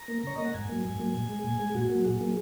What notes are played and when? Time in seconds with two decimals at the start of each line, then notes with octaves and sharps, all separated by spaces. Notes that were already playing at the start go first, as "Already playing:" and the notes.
Already playing: A#5
0.08 A#3
0.23 C#3 C#5
0.36 A#3 D#5
0.45 F#5
0.54 G#2 G#5
0.69 F#3 A#3
0.85 G#2
0.99 F#3 A#3
1.14 A#2
1.29 G#3
1.44 A#2
1.59 G#3
1.75 A#2 F#4
1.90 A#3
1.95 F#3
2.05 A#2 G#4
2.21 F#3 A#3